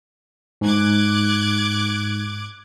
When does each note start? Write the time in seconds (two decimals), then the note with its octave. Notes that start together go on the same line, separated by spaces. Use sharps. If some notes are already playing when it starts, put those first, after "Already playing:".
0.61 G#2 D6 F#6 G#6